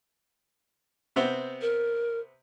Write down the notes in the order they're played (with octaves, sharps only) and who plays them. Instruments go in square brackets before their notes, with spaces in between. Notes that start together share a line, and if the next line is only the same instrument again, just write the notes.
[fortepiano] C3 B3 C4
[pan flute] A#4